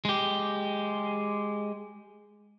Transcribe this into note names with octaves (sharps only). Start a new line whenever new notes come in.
G#3 G4